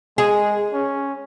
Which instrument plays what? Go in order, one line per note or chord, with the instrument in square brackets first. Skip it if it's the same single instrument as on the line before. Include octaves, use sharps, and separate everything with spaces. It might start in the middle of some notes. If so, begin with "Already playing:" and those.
[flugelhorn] G#3 [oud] G#4
[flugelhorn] C#4